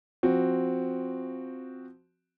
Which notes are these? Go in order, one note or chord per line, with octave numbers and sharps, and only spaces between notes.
F3 C4 F#4